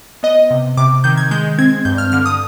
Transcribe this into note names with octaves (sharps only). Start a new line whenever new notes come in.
B3 D#5
C3
C3 D6
D#3 G6
G#6
G#3 G6
C4 G#6
G2 G6
F6
D3 F6
D#6